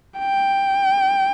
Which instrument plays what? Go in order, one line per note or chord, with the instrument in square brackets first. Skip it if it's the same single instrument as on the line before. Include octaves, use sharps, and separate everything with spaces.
[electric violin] G5